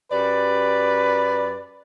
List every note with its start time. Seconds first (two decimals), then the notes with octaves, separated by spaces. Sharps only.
0.12 F#2 G4 B4 D5